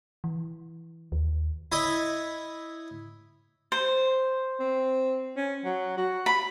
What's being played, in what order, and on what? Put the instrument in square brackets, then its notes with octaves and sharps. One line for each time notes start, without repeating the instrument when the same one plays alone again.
[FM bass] E3
D#2
[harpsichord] E4 C#5 D#5
[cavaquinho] C5
[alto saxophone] C4
C#4
F#3
F#4
[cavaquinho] B5